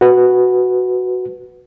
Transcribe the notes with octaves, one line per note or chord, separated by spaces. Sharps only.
F#4 B4